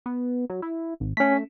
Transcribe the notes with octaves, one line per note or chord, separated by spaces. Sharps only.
B3
F#3
E4
G#1
A3 C#4 B6